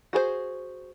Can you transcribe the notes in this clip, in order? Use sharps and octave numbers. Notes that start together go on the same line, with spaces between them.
F#4 G#4 A4 C5